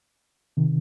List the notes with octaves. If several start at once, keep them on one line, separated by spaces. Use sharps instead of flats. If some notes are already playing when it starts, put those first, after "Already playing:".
C3 D#3